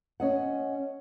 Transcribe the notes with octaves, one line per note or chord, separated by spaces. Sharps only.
C#4 D#5 F#5